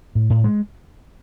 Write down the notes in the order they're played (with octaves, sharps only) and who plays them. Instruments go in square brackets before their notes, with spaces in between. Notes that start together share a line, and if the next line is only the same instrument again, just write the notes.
[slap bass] A2
A2
G#3